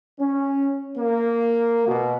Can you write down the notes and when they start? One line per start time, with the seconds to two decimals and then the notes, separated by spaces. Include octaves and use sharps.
0.20 C#4
0.98 A#3
1.87 B2